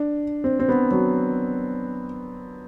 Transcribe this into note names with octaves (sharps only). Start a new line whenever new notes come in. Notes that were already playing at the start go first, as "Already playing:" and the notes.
Already playing: D4
C4
C4
B3
F#3